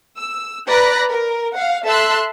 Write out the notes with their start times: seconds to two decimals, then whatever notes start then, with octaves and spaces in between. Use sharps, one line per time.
0.17 E6
0.68 B4 D5 A#5 B5 F#6 A#6
1.10 A#4
1.52 F5 F#5
1.85 A4 E5 A5 C6 E6 F#6